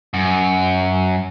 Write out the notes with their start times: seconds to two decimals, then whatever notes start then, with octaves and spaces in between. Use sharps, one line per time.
0.14 F#2